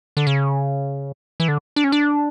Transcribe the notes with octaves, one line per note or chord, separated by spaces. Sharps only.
D3
C#3
E3
D3
D4
C#4
D4